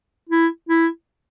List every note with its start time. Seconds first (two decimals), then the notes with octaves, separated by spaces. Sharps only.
0.29 E4
0.69 E4